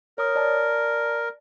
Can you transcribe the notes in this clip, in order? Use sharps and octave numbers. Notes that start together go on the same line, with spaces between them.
A#4 C#5 D#6
D5 A5